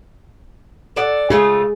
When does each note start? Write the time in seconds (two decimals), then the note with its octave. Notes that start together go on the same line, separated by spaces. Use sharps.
0.96 A4 D5 F#5
1.30 C#3 A3 F4 G#4